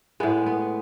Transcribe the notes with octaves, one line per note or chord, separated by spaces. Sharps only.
A2 G#3 B3
B3